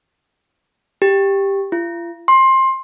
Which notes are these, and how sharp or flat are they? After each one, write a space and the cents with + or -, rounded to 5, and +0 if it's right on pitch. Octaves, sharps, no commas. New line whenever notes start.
G4 +5
F4 -40
C6 +20